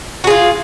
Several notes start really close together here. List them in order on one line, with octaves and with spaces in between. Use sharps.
F#4 G#4 F4